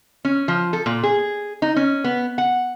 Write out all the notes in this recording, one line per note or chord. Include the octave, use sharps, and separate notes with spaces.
C#4
F3
A4
A#2
G#4
D#4
C#4
B3
F#5